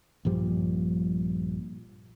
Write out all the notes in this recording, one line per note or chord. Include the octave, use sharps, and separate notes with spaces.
A#1 G2 F3 G3